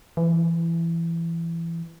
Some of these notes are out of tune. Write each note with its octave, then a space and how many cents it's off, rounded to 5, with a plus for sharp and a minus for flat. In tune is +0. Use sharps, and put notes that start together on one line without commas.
E3 +20